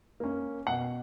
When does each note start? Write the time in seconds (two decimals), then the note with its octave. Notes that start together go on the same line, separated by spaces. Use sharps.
0.20 A#3 C#4
0.67 B2 F#5